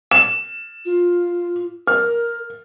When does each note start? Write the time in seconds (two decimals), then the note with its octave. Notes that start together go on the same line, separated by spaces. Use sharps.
0.11 E7
0.85 F4
1.87 A#4 F6